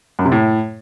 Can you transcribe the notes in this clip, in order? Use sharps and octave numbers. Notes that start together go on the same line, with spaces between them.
F#2
C3
A2